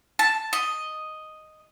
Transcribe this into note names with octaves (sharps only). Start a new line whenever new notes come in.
A5
D#5